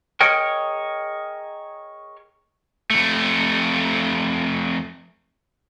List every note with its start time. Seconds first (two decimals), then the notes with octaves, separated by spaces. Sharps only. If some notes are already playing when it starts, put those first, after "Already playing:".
0.21 G#4 A#4 C#5 D#5 G5
2.90 F2 A3